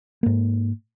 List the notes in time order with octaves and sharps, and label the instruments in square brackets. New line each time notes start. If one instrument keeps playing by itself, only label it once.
[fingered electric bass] G#2 A#3